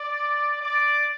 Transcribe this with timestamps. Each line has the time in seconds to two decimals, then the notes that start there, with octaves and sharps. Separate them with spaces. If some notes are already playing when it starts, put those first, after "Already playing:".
Already playing: D5
0.62 D5